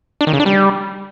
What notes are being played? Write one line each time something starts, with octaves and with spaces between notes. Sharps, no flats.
D4
D#3
C#3
D4
G3